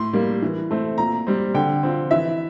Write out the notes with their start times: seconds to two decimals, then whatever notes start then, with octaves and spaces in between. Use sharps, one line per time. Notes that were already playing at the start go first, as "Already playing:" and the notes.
Already playing: A2 C6
0.13 G3 A#3
0.42 E3
0.71 A3 C4
0.98 A#2 A#5
1.27 G3 C4
1.54 D3 G5
1.83 F3 C4
2.11 E3 E5